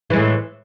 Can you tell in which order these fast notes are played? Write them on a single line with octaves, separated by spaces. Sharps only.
E3 G#3 A2